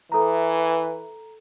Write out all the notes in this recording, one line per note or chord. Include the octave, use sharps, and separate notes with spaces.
E3 A4 A#5